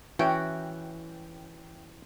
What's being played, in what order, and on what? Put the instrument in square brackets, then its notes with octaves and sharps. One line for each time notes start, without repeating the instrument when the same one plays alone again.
[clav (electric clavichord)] E3 C#4 [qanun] F#4 [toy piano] E5 [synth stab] G5